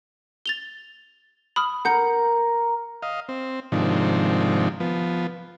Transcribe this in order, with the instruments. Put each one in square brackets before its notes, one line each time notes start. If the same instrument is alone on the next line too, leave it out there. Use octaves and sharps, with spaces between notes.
[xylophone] A6 F7 G7
B5 D#6 F6
[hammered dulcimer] A#4 [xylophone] F#5 G6 C#7
[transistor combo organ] D#5 F5
C4
G#2 C3 D#3 F3 D4
F3 B3